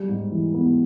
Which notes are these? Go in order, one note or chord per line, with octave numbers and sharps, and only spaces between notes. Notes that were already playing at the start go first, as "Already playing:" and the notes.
Already playing: G3
G#2
E3
B3